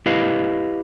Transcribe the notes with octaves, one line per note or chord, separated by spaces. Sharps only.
E4 G4 B4 D#5 F5